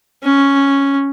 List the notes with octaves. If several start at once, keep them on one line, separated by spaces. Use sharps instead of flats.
C#4